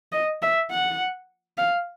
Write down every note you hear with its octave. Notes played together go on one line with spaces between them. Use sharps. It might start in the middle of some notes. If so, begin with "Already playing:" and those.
D#5
E5
F#5
F5